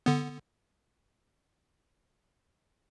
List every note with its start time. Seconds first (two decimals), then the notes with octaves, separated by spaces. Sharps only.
0.06 D3 B3